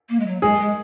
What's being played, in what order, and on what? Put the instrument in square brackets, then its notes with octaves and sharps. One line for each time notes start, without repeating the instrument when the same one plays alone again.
[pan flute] A#3
G#3
F#3
[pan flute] G#3 [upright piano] G#4
[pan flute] G#3